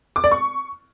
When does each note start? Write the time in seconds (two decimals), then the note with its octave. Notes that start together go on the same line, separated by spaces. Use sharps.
0.16 D6
0.24 D5
0.32 C#6